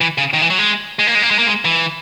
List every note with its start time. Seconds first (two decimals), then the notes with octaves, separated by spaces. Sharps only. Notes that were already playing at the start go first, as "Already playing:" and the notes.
0.01 E3
0.18 C#3
0.33 D#3
0.42 E3
0.50 F#3
0.59 G#3
0.99 G#3
1.07 A#3
1.15 G#3
1.22 A#3
1.31 G#3
1.39 A#3
1.46 G#3
1.65 E3